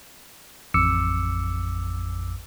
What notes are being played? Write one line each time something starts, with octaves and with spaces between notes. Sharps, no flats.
A1 F2 D6 E6 C#7